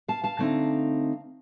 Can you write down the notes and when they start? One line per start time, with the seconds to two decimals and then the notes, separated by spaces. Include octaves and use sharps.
0.08 F5 A5
0.24 F5 A5
0.39 D3 A3 C4 D#4